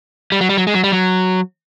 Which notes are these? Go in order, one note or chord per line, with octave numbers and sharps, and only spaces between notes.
G3
F#3
G3
F#3
G#3
F#3
G3
F#3